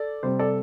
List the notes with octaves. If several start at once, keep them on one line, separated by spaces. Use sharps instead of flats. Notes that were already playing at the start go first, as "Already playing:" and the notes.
Already playing: A4 D5
C3 G3 C4 C5
A4 D5